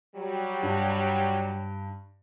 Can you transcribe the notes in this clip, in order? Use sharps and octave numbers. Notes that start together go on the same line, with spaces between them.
F#3 G3
G2